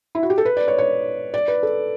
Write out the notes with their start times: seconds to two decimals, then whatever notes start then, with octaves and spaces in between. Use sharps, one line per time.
0.15 E4
0.23 F#4
0.30 G4
0.38 A4
0.45 B4
0.57 D5
0.68 C#5
0.78 C#5
1.34 D5
1.48 B4
1.63 A4